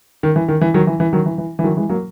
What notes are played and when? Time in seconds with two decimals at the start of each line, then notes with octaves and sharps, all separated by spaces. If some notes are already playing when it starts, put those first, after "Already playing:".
0.23 D#3
0.36 E3
0.48 D#3
0.61 E3
0.74 D#3 F#3
0.87 E3
1.00 E3
1.13 D#3 F#3
1.26 E3
1.38 E3
1.59 E3
1.64 D#3 F#3
1.77 E3 G#3
1.89 F#3 A#3